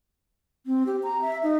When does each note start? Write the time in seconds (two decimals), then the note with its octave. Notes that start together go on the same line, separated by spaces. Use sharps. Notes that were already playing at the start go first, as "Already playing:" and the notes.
0.66 C4
0.86 G4
1.03 A#5
1.22 E5
1.43 D#4